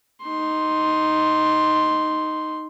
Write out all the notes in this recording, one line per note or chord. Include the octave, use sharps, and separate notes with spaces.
D#4 C6